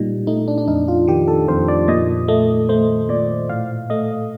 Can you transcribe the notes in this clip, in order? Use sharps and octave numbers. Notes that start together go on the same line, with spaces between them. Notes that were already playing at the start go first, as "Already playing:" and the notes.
Already playing: A#2 G3 D#4
A3 D#4
D4
D4
F2 D#4
F4
D#3 G4
A4
F2 C5
D5
A#2 D#5
A3 D#5
A3 C5
A#2 D5
A2 F5
A3 D#5